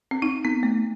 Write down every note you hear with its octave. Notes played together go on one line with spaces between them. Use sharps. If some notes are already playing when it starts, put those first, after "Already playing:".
C4
D#4
B3
A3